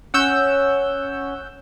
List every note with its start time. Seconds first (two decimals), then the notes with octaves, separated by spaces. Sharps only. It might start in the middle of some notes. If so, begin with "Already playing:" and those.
0.14 C#4 F#5 E6 G6